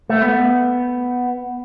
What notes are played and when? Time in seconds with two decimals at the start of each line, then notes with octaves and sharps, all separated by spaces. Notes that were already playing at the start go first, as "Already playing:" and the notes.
0.10 A3
0.22 B3